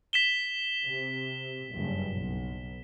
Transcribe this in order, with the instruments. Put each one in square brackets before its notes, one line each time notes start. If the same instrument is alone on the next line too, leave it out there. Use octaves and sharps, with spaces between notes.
[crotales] B6 E7 G7
[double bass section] C3
F#1 G2
B1